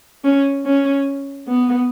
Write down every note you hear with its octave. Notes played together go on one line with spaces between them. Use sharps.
C#4
C#4
B3